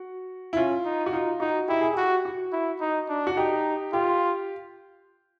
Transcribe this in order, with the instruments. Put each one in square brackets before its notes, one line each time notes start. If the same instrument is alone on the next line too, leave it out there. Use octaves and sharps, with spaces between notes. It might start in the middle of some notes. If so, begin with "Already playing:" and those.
Already playing: [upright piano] F#4
E4
[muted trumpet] C#4 [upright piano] F4
[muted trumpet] D#4
[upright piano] F#4
[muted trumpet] D#4 [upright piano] F4
[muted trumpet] D#4 [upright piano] F#4
[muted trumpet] E4 [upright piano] G4
[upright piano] G#4
[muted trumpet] F#4 [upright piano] G4
[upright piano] F#4
[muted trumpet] E4
D#4
D4
[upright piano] F#4
[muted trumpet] D#4 [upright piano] G4
[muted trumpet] F4 [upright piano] G4